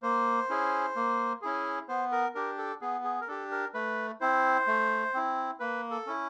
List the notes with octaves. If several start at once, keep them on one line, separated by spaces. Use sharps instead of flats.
A#3 C5
C#4 E4 G#4
A#3
C#4 E4 G#4
B3 C5
A#4
D4 G4 A#4
A4
B3 G#4
G#4
A#4
D4 G4 A4
A#4
A3 B4
C4 E4 C5
A3
C4 E4
A#3 B4
A4
C#4 E4